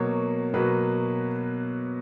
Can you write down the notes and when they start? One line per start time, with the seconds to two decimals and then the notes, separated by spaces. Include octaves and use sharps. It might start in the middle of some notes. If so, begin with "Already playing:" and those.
Already playing: B2 F#3 A#3 C#5
0.54 B2 F#3 A#3 B4